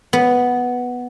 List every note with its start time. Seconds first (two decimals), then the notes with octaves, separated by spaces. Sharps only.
0.13 B3